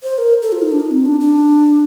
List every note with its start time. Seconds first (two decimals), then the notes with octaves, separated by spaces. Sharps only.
0.03 C5
0.18 A#4
0.42 A4
0.52 F4
0.62 D#4
0.72 D4
0.80 D#4
0.91 C4
1.06 D4
1.20 D4